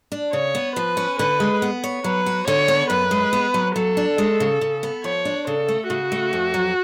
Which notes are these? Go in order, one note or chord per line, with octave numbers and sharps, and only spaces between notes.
D4
C#3 C#5
B3
F3 B4
C#4
D3 B4
G#3
B3
C#5
F#3 B4
F#4
D3 C#5
B3
F#2 B4
G#3
B3
F#3
F#3 A4
D4
G#3
C#3
C#3
B3
F3 C#5
D4
C#3 A4
A3
C#3 F#4
A3
F2
F#3